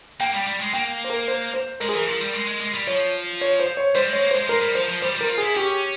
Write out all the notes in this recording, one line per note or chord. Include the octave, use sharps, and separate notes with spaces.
A#3 G5
G3
G3
G#3
A#3 G5
C5
A#4
C5
C5
G#3 A#4
G#4
E3 A#4
F3
G3
G#3
G#3
G#3
G3
F3 C#5
C#5
C5
C#5
G3 C5
G#3
C#5
A#3
G#3 C5
G#3 A#4
G3
F3 C5
F3
G3 C5
G3
A#4
F4
E4 G#4
C#4 G4